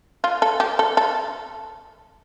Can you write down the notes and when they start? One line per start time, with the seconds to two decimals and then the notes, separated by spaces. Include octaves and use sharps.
0.24 F4
0.42 A4
0.60 G4
0.79 A4
0.97 A4